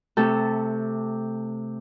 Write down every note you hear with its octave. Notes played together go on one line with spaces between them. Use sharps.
C3 A3 G4 A4